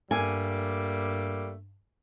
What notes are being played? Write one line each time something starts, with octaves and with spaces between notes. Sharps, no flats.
G2 G3 A3 A#3 G#5